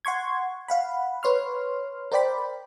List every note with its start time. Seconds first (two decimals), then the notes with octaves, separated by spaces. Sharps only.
0.05 F#5 C6 C#6 G#6
0.68 F5 F#5 B5
1.23 B4 C#5 C6 F6
2.12 A#4 C5 D5 G5 B5